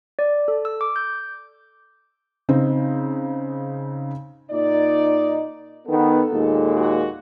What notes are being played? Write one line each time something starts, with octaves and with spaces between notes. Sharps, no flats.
D5
A4
E6
D6
G6
C#3 C4 D#4
A#2 D#4 D5
D#3 B3 A4
D#2 A#2 G#3
F#4